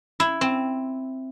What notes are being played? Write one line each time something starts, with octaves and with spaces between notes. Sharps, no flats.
E4
C4